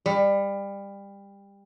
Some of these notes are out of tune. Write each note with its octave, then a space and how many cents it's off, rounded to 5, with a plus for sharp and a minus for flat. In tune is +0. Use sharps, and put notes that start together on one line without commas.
G3 +25